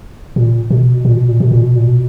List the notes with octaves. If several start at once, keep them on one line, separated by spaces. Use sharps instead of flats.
A#2
B2
A#2
B2
A#2
B2
A#2
B2
A#2
B2